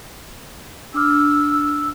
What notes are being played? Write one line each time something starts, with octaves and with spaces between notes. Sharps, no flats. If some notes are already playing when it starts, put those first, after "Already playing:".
D4 D6 E6 F6